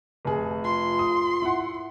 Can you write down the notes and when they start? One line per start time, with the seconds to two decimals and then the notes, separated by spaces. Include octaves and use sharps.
0.25 F1 G#4
0.64 F4 C6
0.99 D#6
1.42 E4 F#5